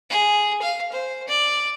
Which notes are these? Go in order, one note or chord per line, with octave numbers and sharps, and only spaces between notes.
G#4
F5
C5
D5